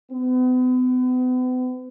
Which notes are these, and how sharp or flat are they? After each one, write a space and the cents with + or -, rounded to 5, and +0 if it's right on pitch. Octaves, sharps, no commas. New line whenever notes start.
B3 +40